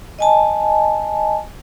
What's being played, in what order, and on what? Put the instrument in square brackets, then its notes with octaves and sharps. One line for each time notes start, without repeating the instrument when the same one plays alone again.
[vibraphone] D#5 G#5 A5